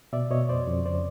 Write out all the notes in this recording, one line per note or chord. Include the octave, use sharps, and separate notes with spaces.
B2 D5 E5
B2 C#5 D#5
F2 C5 D5
F2
C#3 C5 D5